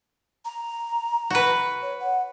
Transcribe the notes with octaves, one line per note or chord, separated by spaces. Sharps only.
A#5
F#4 B4
C#5
F#5